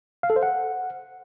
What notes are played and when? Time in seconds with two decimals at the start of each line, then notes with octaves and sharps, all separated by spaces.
0.23 F5
0.30 A4
0.36 C5
0.43 F#5